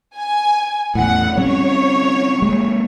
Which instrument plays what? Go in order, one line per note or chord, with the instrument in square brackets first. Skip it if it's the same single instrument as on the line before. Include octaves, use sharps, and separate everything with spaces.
[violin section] G#5
[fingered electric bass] E2 A2 [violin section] F#5
[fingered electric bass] G3 C4 C#4 [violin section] C#5
[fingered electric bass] G#3 A#3